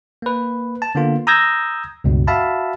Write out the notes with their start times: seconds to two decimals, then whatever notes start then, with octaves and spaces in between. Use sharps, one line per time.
0.22 A#3 B4
0.82 A5
0.95 D3 A#3 B3 F4
1.27 A#5 D#6 E6 G6 G#6 A#6
2.04 C#2 G2 B2
2.27 F#4 E5 F5 A5 B5